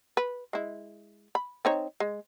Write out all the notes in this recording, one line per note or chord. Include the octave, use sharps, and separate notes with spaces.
B4
G#3 E4
B5
C4 D#4 C#5
G#3